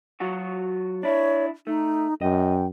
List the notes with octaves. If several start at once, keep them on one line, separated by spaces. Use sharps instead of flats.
F#3 F4 F#4
D4 E4 C#5
A3 D#4
F#2 D#5 G5